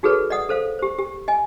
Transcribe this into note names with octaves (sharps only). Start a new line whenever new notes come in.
D#4 F#4 G#4 A4 B4 C#5
D5 D#5 F#5 D#6
A4 C5 F5
G4 C5
G4
D#5 G#5